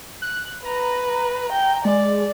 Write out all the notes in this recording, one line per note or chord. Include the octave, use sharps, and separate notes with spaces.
F#6
B4 A#5
G5
G#3 D5